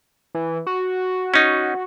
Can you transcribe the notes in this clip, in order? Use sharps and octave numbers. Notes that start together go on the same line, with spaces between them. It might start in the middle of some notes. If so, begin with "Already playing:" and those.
E3
F#4
C#4 D#4